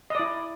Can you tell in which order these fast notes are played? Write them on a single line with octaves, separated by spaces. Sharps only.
D#5 D5 E4